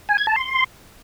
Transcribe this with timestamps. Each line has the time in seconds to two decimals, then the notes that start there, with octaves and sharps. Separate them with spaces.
0.09 G#5
0.18 G#6
0.27 A5
0.36 C6